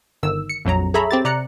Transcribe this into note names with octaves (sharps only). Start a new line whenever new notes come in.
G1 D#3 E6
C#7
A#1 F2 F#3 A#5
G#4 A4 C#5 E5 A#5 B5
C4 G4 A6
C3 D5 A#5 F#6 C#7